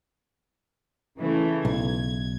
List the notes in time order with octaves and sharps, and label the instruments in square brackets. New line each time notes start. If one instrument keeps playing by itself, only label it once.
[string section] C#3 E3 A3
[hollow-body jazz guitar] B1 [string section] G#6